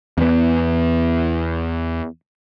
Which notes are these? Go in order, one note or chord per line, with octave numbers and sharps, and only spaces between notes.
E2 B3